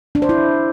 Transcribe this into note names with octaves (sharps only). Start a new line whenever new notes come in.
D4
C5
E4